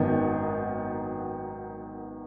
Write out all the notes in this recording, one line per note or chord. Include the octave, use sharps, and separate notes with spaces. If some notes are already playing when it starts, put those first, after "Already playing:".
Already playing: G#1 F#2 D#3 B3 D#4